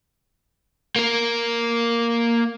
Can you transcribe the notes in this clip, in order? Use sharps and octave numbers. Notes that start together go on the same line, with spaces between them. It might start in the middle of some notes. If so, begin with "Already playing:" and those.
A#3 A#4